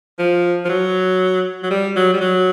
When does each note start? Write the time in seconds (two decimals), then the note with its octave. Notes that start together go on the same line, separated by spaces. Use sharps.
0.19 F3
0.65 F3
0.69 F#3
1.63 F#3
1.71 G3
1.96 F#3
2.13 G3
2.21 F#3